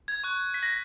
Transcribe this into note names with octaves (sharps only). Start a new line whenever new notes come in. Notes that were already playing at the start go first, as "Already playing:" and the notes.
G#6
C#6 F#6
B6
A#6